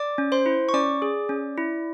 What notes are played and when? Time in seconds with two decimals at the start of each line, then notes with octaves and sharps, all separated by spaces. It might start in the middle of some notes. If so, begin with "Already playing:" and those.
Already playing: D5 D6
0.18 C#4
0.32 C5 C6
0.46 E4
0.69 C#6
0.74 C#4 D5 D6
1.02 G#4
1.29 C#4
1.58 E4